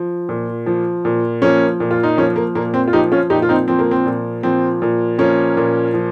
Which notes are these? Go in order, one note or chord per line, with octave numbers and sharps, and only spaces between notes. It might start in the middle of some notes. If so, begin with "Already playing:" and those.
Already playing: F3
A#2
F3
A#2
F3 A#3 C#4
A#2
F4
D#4
F3 A#3 C#4
A#3
A#2 A#3
C4
F4
F3 D#4 G4
C#4 F4
A#2 D#4 G4
F4
C4 D#4
F3 C4
A#3
C4
A#2
F3 C4
A#2
F3 A#3 C#4
A#2
F3